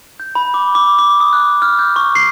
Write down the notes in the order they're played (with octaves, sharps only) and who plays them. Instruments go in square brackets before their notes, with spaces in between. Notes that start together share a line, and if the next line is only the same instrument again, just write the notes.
[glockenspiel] G6
B5
D6
D6
D6
D#6
F#6
F6
G6
C#6
C7